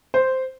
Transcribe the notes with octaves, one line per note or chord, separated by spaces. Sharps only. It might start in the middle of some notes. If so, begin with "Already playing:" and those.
C5